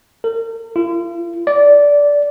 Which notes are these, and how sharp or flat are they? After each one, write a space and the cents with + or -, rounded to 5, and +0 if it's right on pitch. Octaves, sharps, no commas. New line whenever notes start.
A#4 -40
F4 -45
D5 -15